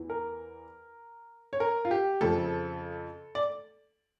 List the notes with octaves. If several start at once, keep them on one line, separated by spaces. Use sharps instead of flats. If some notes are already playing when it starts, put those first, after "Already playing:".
Already playing: E2 E3
A#4
C#5
A#4
F4
G4
F2 C#3 F3 A4
D5